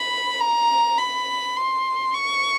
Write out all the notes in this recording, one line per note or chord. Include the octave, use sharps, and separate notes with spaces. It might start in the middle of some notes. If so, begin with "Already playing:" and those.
Already playing: B5
A#5
B5
C6
C#6